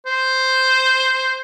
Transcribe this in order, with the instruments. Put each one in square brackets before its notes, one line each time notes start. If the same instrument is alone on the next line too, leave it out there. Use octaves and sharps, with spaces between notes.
[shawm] C5